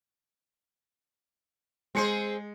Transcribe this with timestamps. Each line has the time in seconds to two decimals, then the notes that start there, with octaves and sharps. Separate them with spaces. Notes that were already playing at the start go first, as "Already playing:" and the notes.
1.95 G#3 C4 G#4 C5 C#7